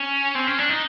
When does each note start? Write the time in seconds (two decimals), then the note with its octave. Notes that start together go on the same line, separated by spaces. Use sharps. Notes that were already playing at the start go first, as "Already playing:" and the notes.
Already playing: C#4
0.35 C4
0.47 C#4
0.59 D4
0.69 D#4